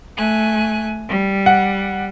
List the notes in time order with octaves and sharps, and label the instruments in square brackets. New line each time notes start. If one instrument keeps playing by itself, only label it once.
[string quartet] A3 G#5 F#6
G3
[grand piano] F#5